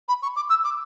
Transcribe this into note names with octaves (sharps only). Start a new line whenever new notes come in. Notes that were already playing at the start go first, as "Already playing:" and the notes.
B5
C#6
D6
E6
D6